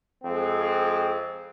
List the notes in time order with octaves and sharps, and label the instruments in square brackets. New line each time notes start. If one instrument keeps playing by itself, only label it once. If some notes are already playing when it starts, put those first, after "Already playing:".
[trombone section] F2 G#3 C4